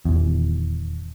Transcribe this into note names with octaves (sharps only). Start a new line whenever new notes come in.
D#1 E2